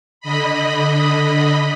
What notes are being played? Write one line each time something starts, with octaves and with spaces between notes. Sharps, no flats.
D3 D#5 B5